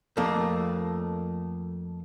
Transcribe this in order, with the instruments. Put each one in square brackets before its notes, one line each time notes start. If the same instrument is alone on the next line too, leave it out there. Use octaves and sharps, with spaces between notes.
[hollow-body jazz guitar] F2 A3 A#3